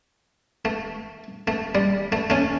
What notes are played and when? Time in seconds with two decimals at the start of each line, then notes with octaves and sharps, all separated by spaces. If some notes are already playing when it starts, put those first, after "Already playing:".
0.65 A3
1.48 A3
1.75 G3
2.12 A3
2.30 A3 C#4